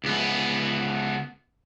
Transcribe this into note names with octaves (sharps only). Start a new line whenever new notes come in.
C#2 B3